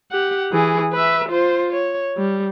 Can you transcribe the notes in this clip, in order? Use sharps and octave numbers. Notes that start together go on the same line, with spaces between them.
G4 F#5
E3 G#4
B4 E5
F4 C5
C#5
G3